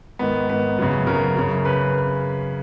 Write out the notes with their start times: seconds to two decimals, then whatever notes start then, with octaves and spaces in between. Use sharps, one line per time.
0.19 G#2 D#3 B3
0.49 G#2 D#3 B3
0.78 F#2 C#3
1.07 F#2 C#3 A#4
1.36 F#2 C#3
1.65 C#3 B4